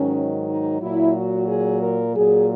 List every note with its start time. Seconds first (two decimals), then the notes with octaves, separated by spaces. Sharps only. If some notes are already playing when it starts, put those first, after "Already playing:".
Already playing: G#2 D#3 F#3 C#4
0.49 D#4
0.81 A#2 F#3 E4
1.15 F#4
1.48 G#4
1.81 A#4
2.14 A#2 F#3 G#4